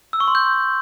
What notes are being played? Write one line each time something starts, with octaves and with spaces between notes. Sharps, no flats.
E6
C#6
C6
G6